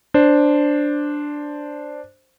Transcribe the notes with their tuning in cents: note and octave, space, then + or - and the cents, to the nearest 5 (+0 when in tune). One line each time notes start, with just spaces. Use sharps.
D4 +0 C5 +0